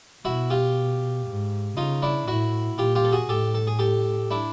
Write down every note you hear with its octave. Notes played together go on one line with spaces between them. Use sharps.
B2 E4 F#4
F4 G4
G#2
C#3 D#4 F4
D4 E4
A2 E4 F#4
A#2 F4 G4
F4 G4
A4
F#4 G#4
A2 G4 A4
A4
G#4
G4 A4
D4 E4